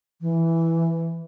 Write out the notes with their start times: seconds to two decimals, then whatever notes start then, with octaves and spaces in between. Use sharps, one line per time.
0.21 E3